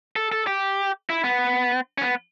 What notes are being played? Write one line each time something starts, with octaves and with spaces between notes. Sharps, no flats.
A4
A4
G4
E4
B3
C#4
B3